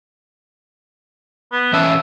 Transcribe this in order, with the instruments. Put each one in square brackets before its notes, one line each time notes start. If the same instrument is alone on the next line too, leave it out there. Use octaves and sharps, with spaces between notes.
[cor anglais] B3
[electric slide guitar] E3 C#4 A5 [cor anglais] E5